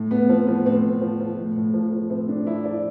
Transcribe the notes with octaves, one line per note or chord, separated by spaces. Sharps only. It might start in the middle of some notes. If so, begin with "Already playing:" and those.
Already playing: A2
A2 B3
F3 C4
F3 B3
A2 C4
A2
F3
F3
A2
A2
F3
F3
A2 C4
A2 D4
F3 E4
F3 D5